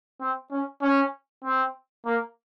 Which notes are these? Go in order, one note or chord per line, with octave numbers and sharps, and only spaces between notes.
C4
C#4
C#4
C4
A#3